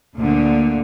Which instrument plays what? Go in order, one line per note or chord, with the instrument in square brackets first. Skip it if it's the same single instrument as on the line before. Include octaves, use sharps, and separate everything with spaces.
[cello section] D2 A#2 D3